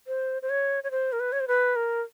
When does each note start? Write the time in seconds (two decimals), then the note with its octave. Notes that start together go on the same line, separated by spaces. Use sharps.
0.07 C5
0.42 C5
0.50 C#5
0.84 C#5
0.91 C5
1.12 A#4
1.20 B4
1.32 C#5
1.40 C5
1.48 B4
1.76 A#4